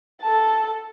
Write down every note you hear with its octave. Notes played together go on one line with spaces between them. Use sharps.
A4 A5